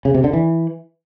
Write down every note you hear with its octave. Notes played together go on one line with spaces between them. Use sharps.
C#3
C3
D3
E3